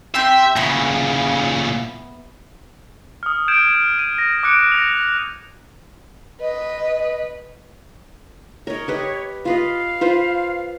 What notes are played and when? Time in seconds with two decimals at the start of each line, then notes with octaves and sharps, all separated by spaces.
0.15 C4 G4 E5 C6
0.56 A#2 C#3 B3 E4
3.23 D#6 F6
3.48 F6 G6 G#6 D7 E7
3.99 D#7
4.18 A#6
4.43 D6 F#6 C#7 D7
4.72 A#6 F7
6.41 B4 D#5
8.67 A#4 C#5 D#5
8.88 G4 B4 D#5
9.45 F4 B4 D#5 F5
10.01 F4 B4 C5